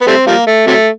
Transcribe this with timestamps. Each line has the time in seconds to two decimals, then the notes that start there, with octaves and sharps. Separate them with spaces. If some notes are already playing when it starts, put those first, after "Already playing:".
0.01 B3
0.07 G3 A3 C4
0.27 F3 G3 A#3
0.47 A3
0.67 C3 F#3 A3